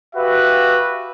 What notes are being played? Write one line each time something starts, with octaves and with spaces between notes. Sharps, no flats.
F#4 G4 B4 E5 F5